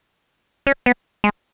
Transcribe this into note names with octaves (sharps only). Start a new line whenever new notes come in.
C#4
B3
G#3